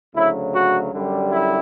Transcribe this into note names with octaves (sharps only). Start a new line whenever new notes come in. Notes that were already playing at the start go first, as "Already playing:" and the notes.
D2 C#3 F#3 E4
F#4
F#2 D3 G3
E4